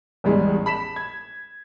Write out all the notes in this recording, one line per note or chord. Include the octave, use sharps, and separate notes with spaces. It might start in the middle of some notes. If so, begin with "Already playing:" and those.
A1 E2 G3 G#3
B5 B6 E7
G#6